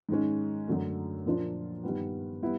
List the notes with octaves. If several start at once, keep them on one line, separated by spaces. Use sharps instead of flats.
G#2 D#3 G#3 C#4
F#2 D3 F#3 A3
A#2 F3 A#3 D4 F4
G2 D#3 G3 B3
G3 B3 E4